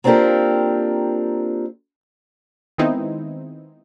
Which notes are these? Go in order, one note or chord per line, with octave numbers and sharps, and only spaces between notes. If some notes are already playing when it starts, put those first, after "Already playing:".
A#3 C4 D4 F4 G4 A#4
D#3 G#3 B3 C4 D#4 E4